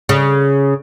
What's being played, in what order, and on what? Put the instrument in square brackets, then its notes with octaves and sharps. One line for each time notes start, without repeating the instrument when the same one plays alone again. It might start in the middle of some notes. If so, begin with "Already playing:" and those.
[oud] C#3